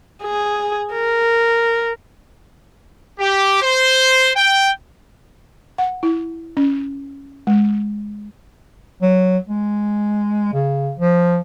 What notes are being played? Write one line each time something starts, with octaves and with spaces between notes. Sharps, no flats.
G#4
A#4
G4
C5
G5
F#5
E4
C#4
G#3
F#3
G#3
C#3
F3